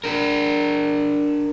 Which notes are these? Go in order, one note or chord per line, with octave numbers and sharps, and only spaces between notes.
D4 A#4